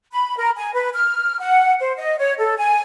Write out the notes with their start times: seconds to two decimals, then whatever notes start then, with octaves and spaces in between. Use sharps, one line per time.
0.12 B5
0.37 A#4
0.57 G#5
0.74 B4
0.95 F6
1.39 F#5
1.80 C5
1.97 D#5
2.19 C#5
2.38 A4
2.58 G#5